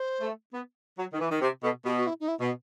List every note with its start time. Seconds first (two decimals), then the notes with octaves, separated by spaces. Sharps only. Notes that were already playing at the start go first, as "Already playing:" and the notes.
Already playing: C5
0.21 A3
0.54 B3
0.98 F#3
1.13 D#3
1.19 E3 B4
1.30 D#3
1.41 C3 C5
1.63 B2 A4
1.85 B2 G4
1.97 F#4
2.07 E4
2.20 D#4
2.28 E4
2.40 B2